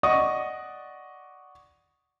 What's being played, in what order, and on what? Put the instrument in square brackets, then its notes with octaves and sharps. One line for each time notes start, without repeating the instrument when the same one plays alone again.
[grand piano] D5 D#5 F#5 C#6 D#6